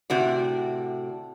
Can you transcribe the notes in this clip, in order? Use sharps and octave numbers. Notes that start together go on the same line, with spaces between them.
A2 C3 F#4 D5